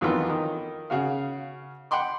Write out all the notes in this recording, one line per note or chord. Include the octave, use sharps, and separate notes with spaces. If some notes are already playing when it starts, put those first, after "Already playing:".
F2 D#3 E3 F#3 B3 F4
D#3
C#3 F#4 F5
F#5 G5 B5 C6 D6